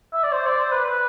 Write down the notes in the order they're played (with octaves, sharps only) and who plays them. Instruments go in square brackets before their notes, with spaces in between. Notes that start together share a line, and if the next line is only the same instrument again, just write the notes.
[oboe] E5
D5
C5
D5
C5
B4
B4